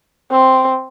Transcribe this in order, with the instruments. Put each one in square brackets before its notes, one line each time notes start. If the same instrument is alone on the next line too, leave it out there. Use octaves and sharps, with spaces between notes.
[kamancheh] C4